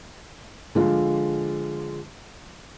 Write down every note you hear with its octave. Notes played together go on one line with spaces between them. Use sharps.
D3 F3 G#3 D4 F4